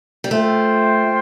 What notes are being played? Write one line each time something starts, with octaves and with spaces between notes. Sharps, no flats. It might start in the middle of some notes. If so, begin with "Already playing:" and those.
G3
A3 F4 C5 G5